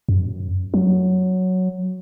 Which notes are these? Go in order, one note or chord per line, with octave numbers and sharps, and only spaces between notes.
F#2
F#3